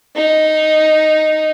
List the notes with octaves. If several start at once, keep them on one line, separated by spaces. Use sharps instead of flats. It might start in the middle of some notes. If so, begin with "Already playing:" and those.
D#4